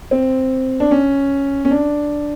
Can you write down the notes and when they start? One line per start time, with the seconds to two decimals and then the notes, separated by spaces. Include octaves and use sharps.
0.11 C4
0.80 D4
0.91 C#4
1.65 C#4
1.71 D4